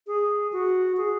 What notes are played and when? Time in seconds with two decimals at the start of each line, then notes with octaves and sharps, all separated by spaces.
0.07 G#4
0.52 F#4
0.97 G#4